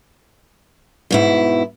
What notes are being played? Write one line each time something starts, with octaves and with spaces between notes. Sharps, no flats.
G#2 B2 E4